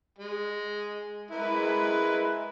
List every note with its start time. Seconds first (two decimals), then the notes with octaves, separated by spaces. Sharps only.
0.18 G#3
1.31 G#3 E4 A#4 B4